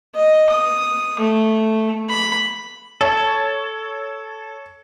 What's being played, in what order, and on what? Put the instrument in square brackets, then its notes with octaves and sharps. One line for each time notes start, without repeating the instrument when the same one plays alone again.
[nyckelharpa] D#5
D#6
A3
B5
[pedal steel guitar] A4 [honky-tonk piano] C#5